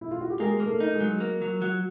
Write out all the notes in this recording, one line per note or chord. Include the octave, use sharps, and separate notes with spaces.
E4
F4
F#4
G4
G#3 A#3 G#4
A#3
A3 A4
D#4
G#3 G#4
F#3
A#3
F#3
F#3